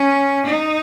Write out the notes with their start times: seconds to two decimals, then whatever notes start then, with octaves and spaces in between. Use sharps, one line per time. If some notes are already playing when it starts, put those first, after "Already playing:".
Already playing: C#4
0.46 D#4